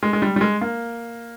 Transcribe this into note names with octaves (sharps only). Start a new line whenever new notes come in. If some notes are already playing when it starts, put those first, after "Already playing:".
G#3
G#3
G3
G3
G#3
A#3